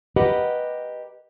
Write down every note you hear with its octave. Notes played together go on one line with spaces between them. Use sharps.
G4 A#4 B4 D#5 F#5